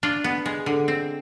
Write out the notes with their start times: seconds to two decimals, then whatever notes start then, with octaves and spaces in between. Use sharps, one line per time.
0.03 D4 F4
0.24 B3
0.46 G#3
0.66 D3
0.88 C4